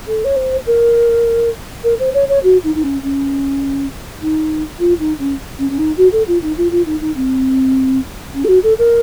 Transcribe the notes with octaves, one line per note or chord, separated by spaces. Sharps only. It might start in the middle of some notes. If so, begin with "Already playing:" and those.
A4
C#5
C5
A#4
A#4
C5
C#5
C#5
F#4
D#4
D#4
C#4
C#4
D#4
F4
D#4
C#4
C#4
C#4
D#4
F#4
A4
F4
D#4
F4
F4
D#4
D#4
C4
C#4
A4
F#4
A4
A#4